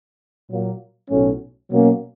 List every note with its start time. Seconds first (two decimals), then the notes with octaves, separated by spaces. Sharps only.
0.50 A#2 F#3 A#3
1.09 B1 A2 F#3 A3 C#4
1.69 B2 F#3 A#3 C#4